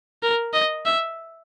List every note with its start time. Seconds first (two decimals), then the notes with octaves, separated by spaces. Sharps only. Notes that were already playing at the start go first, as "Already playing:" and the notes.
0.23 A#4
0.53 D#5
0.85 E5